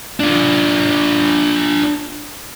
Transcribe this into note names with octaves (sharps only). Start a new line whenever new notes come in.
D4 F4